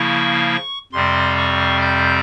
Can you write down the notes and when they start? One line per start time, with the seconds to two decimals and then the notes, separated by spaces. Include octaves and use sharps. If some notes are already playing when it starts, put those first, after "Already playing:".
Already playing: C#3 F3 A#3 E4 C#6
0.93 F2 C3 G3 C4 C6
1.38 C#6
1.81 G6